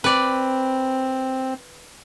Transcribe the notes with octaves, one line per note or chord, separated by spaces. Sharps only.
C4 B4 D5